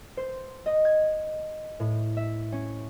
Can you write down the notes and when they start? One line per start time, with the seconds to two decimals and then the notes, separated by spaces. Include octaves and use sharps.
0.17 C5
0.66 D#5
0.85 G#6
1.80 A2
2.17 E5
2.52 C#4